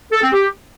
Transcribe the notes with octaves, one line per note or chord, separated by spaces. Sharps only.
A4
C4
G4